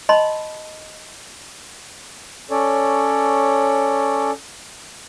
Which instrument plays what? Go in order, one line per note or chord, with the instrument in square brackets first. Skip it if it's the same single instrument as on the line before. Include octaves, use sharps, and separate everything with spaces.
[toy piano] D#5 A5 B5 C6
[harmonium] C#4 A4 C#5 D5